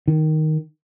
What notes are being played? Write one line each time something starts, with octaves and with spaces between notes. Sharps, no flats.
D#3